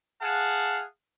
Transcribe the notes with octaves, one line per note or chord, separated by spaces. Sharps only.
G#4 F5 F#5 A5